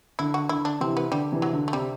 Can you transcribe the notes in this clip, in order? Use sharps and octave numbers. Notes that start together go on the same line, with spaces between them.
D3 E4
F#4
D3 E4
D4
C3 E3 C4
B3
D3 G3
C3 E3
F#3
D3
A3
C3 G3